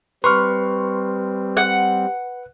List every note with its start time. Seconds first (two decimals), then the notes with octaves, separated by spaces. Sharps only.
0.24 G3 C4 B4 C6 C#6 F6
1.57 F#5